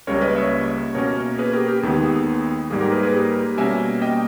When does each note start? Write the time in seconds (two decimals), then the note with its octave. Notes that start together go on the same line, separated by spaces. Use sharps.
0.07 C#2 C#3 G3 A#3 A#4 C#5
0.21 B4 D#5
0.36 C#5 E5
0.95 B2 A#3 C#4 A#4 C#5
1.38 G#4 B4
1.53 G4 A#4
1.68 G4
1.83 D#2 D#3 G#3 B3 G#4
2.70 G#2 G3 A#3 G#4
2.81 G4 A#4
2.92 G#4 B4
3.03 G#4 B4
3.14 G4 A#4
3.57 B2 G3 A#3 C#4 E5 G#5
4.02 D#5 G5